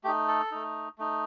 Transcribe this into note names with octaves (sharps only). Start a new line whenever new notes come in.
A3 D#4 G4
A4
A3 D#4
A3 D#4